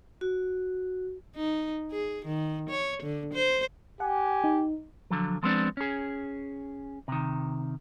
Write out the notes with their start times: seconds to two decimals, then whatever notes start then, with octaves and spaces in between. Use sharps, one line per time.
0.21 F#4
1.36 D#4
1.92 G#4
2.26 D#3
2.70 C#5
3.03 D3
3.34 C5
4.00 G4 F#5 G#5
4.44 D#4
5.10 D3 F3 F#3
5.43 F3 G#3 B3 C4 D4
5.77 C#4 G#4
7.08 C3 D#3